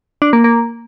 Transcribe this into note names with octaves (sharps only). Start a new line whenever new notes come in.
D4
A#3
A#3